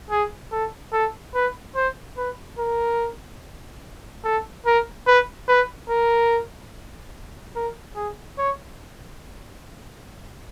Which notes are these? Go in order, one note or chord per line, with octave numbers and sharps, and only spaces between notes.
G#4
A4
A4
B4
C5
B4
A#4
A4
A#4
B4
B4
A#4
A#4
G#4
C#5